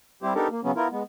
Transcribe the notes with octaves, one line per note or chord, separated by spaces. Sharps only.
G3 C4 E4 G4 C5
B3 D4 D#4 G4 A4 A#4
A#3
C#3 F#3 B3 C#4
B3 E4 F4 A#4
G#3 B3